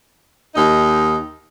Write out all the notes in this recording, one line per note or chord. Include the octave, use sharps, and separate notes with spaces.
D#2 D#4